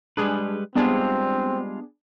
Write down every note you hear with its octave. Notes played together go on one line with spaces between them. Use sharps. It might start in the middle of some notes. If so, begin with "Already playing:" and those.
G3 G#3 D4 G#4 B4
G3 G#3 B3 C4 D4 F4 G#4